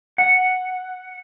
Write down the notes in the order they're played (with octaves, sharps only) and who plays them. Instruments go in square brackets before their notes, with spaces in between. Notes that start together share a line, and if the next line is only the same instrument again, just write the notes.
[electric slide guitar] F#5